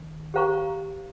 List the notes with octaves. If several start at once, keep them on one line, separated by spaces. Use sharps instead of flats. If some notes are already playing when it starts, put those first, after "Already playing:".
Already playing: D#3
G4 C5 F5 A#5 C#6